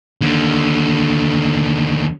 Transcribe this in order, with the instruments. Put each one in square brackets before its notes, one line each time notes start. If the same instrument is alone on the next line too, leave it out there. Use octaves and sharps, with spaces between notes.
[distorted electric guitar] D#2 D3